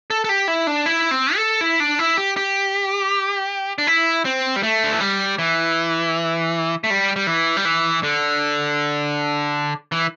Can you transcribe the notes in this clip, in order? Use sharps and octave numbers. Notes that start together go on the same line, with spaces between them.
A4
A4
G4
E4
D4
E4
C4
A4
E4
D4
E4
G4
G4
D4
E4
C4
G3
A3
D3
E3
G3
E3
A3
G3
G3
E3
G3
E3
D3
E3